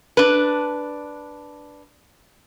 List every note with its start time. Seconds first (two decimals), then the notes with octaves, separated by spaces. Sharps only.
0.17 D4 B4